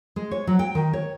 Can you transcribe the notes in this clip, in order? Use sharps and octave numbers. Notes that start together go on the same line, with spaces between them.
G#3
C#5
F#3
G5
D#3
C#5